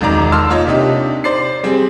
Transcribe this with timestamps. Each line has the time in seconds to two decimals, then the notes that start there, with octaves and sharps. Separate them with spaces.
0.01 E1 C#2 D#3 D5 A#5 D6
0.32 A5 C6 E6 F6
0.50 A#3 F4 C#5 D#5
0.67 C3 D4 D#4 G4
1.24 C5 D5 C7
1.63 G3 C4 G#4